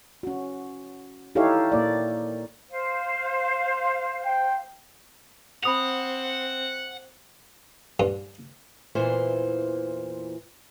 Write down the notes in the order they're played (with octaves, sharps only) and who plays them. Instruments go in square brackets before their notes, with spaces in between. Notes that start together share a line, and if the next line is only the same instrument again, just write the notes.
[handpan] C#4 F#4
D#4 E4 G4 A4 C#5 F5
A#2 A#3 D5
[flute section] C5 F5
[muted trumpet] G5
[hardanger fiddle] C4 [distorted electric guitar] F#5 [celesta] B5 D#6 F7
[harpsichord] G2
[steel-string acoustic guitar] E2 A#2 E3 C5